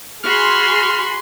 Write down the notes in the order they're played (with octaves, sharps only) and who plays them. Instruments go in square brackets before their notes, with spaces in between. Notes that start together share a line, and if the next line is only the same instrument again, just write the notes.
[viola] F#4 B5 [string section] G#4 C6 [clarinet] F6